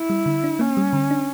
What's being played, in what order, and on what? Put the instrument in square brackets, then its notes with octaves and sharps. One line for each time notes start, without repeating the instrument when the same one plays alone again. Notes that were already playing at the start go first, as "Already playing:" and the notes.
Already playing: [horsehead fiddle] E4
[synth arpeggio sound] G3
D3
D4
[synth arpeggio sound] A#3 [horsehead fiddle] C#4
[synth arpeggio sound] G3
D3
D4